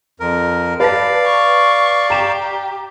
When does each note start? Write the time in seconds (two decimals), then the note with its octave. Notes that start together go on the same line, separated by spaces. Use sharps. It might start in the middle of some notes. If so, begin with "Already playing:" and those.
0.20 F2 A#4
0.80 B4 D5 F5 A5 A#6
1.25 C#6
2.10 G4 A#5 E7